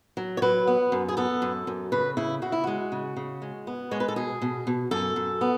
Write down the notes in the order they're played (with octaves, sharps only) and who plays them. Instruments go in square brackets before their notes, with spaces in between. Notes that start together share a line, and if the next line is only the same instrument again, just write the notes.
[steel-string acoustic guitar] F#3
C#5
F#3 B4
B3
F#2
G#4
B3 A4
F#2
F#2
C#3 B4
C#3 E4
C#3 F#4
E4
G#3 F#4
C#3
C#3
G#3
B3
G#3 C#5
B4
A4
B2 G#4
B2
B2
F#2 A4
F#2
B3